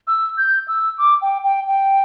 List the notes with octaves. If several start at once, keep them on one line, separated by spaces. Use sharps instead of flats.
E6
G6
E6
D6
G5
G5
G5